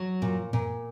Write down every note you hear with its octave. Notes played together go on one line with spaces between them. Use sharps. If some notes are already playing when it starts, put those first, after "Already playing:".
Already playing: F#3
A#2
A#2